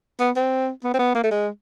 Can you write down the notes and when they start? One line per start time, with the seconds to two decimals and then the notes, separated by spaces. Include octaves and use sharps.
0.20 B3
0.36 C4
0.84 B3
0.94 C4
0.99 B3
1.15 A#3
1.24 A3
1.31 G#3